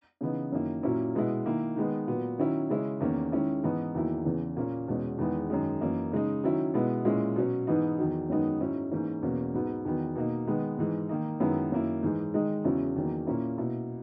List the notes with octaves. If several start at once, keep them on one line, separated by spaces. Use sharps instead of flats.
C#3 E3 B3 D#4
F#2 D#3 A#3 E4
A#2 F#3 A#3 C#4 E4
B2 G#3 B3 E4
D#3 A#3 E4
D#3 G#3 B3
A#2 F#3 B3
D#3 F#3 C#4 E4
C#3 G#3 C#4 E4
E2 D#3 A#3 C#4
D#3 G#3 C#4 E4
G#2 E3 B3 D#4
E2 D#3 F#3 A#3 E4
E2 C#3 E3
A#2 A#3 C#4
E2 B2 G#3 C#4
E2 D#3 G#3 B3 E4
F#2 D#3 G#3
F#2 E3 A#3 D#4
C#3 G#3 D#4
D#3 F#3 C#4 E4
B2 G#3 B3 E4
A#2 G#3 C#4 E4
B2 F#3 C#4
G#2 E3 B3 D#4
E2 D#3 F#3
F#2 D#3 G#3 B3 D#4
G#2 F#3 C#4 E4
G#2 E3 A#3 C#4
E2 B2 A#3 C#4
G#2 F#3 B3
E2 D#3 F#3 B3
B2 A#3 D#4
D#3 G#3 B3
G#2 E3 G#3
D#3 A#3 D#4
F#2 D#3 G#3 B3 E4
F#2 D#3 A#3 E4
G#2 E3 G#3
D#3 G#3 D#4
E2 C#3 F#3 C#4 E4
E2 D#3 F#3 A#3
A#2 A#3 C#4 E4
B2 A#3 E4